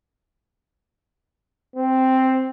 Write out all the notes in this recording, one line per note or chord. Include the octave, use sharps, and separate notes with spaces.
C4